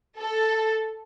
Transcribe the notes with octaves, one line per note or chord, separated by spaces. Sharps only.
A4